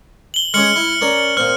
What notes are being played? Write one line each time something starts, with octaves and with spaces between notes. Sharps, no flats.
F#7 G7
G#3 C#4 G#4 F6 C#7 F#7
E4
C#4 A#4 D5
A#2 C4 F6